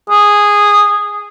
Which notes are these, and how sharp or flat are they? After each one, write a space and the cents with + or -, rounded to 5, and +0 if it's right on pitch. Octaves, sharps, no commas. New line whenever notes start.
G#4 -10